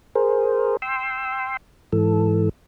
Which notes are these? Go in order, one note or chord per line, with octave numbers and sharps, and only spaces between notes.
G#4 A#4 C5
G5 C6 E6
G#2 E3 A4